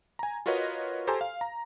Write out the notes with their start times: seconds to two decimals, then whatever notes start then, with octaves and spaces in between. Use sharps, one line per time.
0.19 G#5 A#5
0.46 F4 F#4 A#4 B4 C#5 D#5
1.07 G4 A4 C5 G#5 A#5 C6
1.21 F5
1.41 A#5